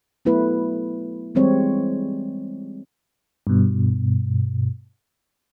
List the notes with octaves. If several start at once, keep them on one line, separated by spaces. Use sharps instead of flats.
F#3 A3 B3 E4 B4
E3 G3 G#3 C4 C#5
G2 B2